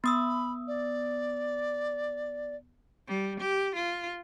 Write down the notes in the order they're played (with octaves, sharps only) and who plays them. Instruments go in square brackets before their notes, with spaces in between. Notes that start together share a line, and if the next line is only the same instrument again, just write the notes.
[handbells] B3 D#6 E6 [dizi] B5
[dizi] D5
[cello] G3
G4
F4